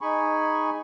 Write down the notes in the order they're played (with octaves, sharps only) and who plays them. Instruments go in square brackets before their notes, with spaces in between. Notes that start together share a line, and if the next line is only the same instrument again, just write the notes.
[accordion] D#4 G#4 G#5 B5 C#6